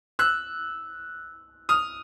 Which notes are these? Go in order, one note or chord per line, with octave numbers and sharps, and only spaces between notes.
E6 F#6
D#6 F6